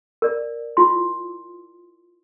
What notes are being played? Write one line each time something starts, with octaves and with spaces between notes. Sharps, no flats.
A#4 D5
E4 F4 C6